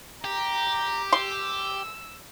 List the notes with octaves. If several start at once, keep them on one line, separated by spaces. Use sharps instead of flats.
G4 A#5
C6 E6